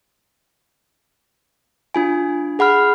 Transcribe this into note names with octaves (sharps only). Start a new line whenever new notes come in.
D4 F4 G#5
G#4 F#5 B5 F6